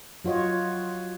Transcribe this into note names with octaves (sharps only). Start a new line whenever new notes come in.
F#3 F4 F#4 C#5 D#5